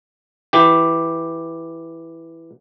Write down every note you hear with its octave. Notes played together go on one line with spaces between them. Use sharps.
E3 G4